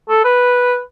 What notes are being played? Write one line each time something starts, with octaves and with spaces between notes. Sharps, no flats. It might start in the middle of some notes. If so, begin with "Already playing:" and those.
A4
B4